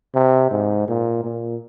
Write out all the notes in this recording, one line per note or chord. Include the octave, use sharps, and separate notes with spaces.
C3
G#2
A#2
A#2